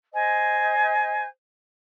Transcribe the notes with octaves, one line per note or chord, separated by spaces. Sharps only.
C5 D#5 G#5